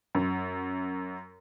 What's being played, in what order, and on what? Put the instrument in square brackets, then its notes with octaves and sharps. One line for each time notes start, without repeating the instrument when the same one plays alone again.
[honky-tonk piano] F#2